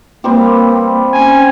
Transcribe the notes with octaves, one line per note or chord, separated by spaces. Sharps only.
G3 A#3 C4 G4
C#4 G#5